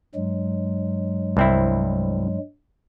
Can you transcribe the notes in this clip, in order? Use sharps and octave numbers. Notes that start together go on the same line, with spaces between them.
G2 F#3 G#3
C2 C4 E4